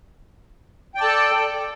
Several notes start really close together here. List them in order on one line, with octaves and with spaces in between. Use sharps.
G5 D5 A5 A4